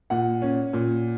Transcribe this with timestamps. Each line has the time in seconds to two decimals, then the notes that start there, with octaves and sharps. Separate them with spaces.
0.10 A#2 F#5
0.42 C#4
0.73 A#2